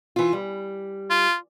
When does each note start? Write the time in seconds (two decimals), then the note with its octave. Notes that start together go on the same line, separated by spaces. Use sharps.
0.16 E3 F4
0.33 G3
1.10 F4